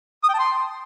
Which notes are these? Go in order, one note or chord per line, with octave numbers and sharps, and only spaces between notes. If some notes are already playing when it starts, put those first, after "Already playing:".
D#6
G5
A5
C6